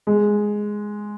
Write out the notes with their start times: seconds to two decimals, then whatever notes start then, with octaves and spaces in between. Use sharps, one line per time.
0.07 G#3